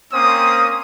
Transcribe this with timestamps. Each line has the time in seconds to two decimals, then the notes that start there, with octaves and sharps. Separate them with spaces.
0.12 A#3 C4 C#4 C5 D#6